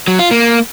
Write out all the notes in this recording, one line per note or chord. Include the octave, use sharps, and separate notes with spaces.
F#3
F4
A#3